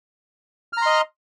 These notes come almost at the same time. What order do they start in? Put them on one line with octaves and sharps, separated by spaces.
F6 A#5 C6 D#5